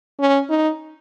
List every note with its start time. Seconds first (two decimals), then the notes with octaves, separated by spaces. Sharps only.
0.19 C#4
0.50 D#4